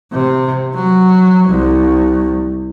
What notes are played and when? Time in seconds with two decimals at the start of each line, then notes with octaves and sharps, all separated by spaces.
0.12 C3
0.75 F#3
1.48 C2